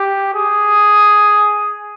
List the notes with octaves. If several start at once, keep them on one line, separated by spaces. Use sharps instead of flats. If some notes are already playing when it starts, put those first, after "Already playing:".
Already playing: G4
G#4